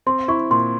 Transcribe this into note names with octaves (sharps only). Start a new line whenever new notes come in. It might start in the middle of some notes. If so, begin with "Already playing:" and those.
C4 C6
E4 C#6
A#2 C6